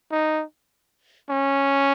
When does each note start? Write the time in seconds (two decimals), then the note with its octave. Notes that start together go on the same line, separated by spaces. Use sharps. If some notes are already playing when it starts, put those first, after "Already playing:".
0.12 D#4
1.30 C#4